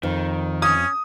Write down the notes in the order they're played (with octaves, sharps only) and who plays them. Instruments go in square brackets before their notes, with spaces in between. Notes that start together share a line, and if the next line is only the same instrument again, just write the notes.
[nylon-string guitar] F2 [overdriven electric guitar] D#3
[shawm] C#4 [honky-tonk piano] D#6